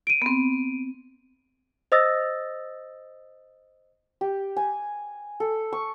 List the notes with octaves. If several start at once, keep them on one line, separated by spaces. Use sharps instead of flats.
D7 D#7
B3 C4
C5 D#5 D#6 E6 A6 A#6
G4
G#5
A4
C#6